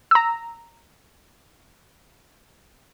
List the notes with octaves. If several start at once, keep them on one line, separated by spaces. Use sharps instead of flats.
A#5 E6